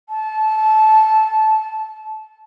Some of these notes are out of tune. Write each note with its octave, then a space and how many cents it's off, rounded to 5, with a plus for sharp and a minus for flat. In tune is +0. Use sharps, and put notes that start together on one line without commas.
A5 -20